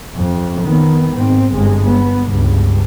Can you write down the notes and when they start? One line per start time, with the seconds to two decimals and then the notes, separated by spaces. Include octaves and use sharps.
0.16 F2
0.62 D#3 B3
1.11 G#2 C4
1.53 G1 G#3
1.86 B3
2.29 C#2 G2